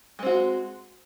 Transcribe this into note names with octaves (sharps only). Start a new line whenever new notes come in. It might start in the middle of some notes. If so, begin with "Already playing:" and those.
G#3 C4 F#4